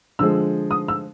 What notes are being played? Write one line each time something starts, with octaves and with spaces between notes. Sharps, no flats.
D3 F3 G#3 E6
D#6
E6